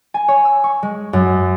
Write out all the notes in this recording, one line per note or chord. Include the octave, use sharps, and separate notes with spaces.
G#5
C#5
E6
C#6
G#3
F#2